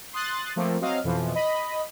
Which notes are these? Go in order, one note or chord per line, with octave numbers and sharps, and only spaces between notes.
C6 D#6 F#6 A6
F3 A3 A#3 C4
F#3 C4 D#5 F5
F2 B2 E3 F3
D#5 B5